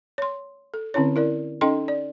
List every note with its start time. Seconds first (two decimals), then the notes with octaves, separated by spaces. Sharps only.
0.18 C#5 C6
0.74 A4
0.94 D3 C4 C#4 E4 C#5
1.16 E4 A#4 D5
1.61 C#4 D#4 A4 D#5 G5 C6
1.88 D5